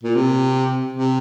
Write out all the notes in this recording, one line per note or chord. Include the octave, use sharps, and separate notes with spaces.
A#2
C3
C3